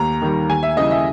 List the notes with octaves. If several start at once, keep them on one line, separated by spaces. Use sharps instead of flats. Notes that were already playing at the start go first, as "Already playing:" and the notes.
Already playing: D#2 A#5
D#3 G3
D#2 G#5
E5
C#3 E3 G3 D#5
E5